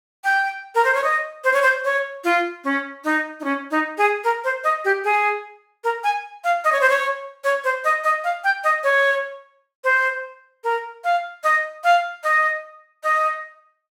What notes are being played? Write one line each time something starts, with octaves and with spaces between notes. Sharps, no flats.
G5
A#4
C5
C#5
D#5
C5
C#5
C5
C#5
F4
C#4
D#4
D#4
C#4
D#4
G#4
A#4
C5
D#5
G4
G#4
A#4
G#5
F5
D#5
C#5
C5
C#5
C#5
C5
D#5
D#5
F5
G5
D#5
C#5
C5
A#4
F5
D#5
F5
D#5
D#5